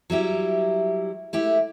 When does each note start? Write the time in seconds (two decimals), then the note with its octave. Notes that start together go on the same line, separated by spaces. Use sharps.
0.10 F#3 G3 E4 G4
1.33 A3 E4 G4